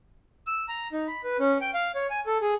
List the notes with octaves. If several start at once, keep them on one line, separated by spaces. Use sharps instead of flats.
E6
A#5
D#4
B5
B4
C#4
G5
F5
C#5
G#5
A4
G#4